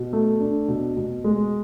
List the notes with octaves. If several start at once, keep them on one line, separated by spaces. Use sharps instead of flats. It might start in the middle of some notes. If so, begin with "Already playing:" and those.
Already playing: B2
A3
D4
B2
B2
G#3